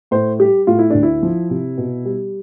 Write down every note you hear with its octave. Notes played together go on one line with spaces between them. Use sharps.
A2 C5
G3 G4
A2 F4
E4
D2 D4
E4
F3
C3
B2
G3